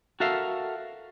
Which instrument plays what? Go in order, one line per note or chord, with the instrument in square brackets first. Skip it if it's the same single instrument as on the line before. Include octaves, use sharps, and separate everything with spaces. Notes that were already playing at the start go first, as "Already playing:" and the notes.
[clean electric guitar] F#4 A4 A#4 E5 F5